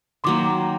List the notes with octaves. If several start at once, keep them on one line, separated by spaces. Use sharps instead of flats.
D#3 F#3 A#3 C6 D6